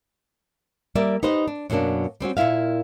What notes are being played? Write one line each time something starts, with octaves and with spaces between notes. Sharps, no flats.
G3 A#3 A#4 D5 E5
D#4 G4 B4 C5 D#5
D4
F#2 B2 F#3 A#3 D4
G3 C4 C#4 F#4
A#2 A#3 E4 E5 F5